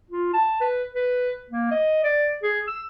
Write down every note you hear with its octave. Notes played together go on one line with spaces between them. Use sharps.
F4
A5
B4
B4
A#3
D#5
D5
G#4
E6